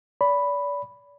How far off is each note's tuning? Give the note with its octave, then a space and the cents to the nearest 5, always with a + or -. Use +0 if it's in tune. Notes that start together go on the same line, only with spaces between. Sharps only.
D5 -35 B5 +0